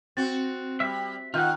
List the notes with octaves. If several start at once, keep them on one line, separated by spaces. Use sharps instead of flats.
C4 F#4 A6
G3 E5
D#3 F4 F#5 F6 G6